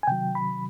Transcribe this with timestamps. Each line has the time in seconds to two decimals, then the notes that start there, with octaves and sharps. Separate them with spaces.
0.03 G#5
0.07 C3 D#3 F#3 G5
0.35 B5